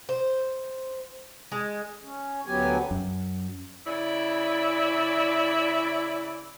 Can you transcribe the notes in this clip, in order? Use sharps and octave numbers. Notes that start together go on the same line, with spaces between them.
C5
G#3
C#4
D2 F#3 B3 G4 G#5
F#2
C#3 E4 D5